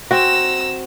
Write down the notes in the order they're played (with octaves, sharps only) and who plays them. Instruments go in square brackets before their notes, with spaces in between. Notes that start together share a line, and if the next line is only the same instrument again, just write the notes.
[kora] C4 F#4 [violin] A#5 E6